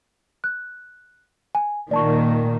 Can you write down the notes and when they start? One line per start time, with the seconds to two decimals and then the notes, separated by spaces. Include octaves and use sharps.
0.44 F#6
1.55 G#5
1.91 A#2 D#3 D5 A5 C#6